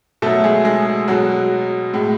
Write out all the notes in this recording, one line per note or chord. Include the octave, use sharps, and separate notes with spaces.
B2 F#3 A3 A4
G#3 G#4
G#3 G#4
B2 F#3 G#3 F#4
A2 G#3